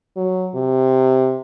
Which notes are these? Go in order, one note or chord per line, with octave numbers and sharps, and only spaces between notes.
F#3
C3